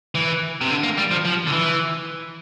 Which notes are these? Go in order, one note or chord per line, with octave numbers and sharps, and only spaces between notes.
E3
C3
D3
A#3
G3
F3
F3
D3
E3